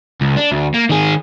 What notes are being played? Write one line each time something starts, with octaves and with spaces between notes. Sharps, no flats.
C#2
D4
D2
A#3
D#3 G#4